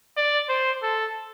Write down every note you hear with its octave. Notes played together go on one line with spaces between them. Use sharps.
D5
C5
A4